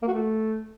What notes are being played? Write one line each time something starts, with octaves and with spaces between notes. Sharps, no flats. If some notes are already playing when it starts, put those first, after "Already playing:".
A#3
F#4
A3